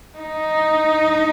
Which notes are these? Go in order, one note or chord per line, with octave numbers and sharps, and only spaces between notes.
D#4